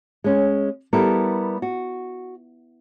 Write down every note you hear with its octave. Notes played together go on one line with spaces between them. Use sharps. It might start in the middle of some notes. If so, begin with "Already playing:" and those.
G#3 C#4
G3 B3 E4 A4 A#4
F#4